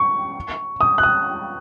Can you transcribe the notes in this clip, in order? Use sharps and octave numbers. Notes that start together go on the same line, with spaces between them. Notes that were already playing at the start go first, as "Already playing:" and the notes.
Already playing: C#6
D#6
F#6
D#6